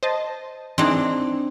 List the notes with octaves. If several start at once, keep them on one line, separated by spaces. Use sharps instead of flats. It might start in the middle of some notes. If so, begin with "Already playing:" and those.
C5 D#5 A5
E3 C4 D4 D#4 G#4